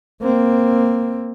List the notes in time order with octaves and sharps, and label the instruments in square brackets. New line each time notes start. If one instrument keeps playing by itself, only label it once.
[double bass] A#3 C4